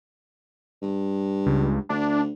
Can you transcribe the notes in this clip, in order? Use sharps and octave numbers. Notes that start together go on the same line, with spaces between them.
G2
C#2
D2 D4